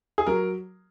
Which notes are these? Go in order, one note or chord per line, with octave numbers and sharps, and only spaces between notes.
G#4
F#3 A#4